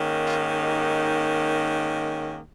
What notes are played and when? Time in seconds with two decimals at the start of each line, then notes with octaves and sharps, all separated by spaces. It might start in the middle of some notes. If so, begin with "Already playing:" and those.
Already playing: G#2 D#3 A#3 C#4
0.23 F4
0.59 D#4 G4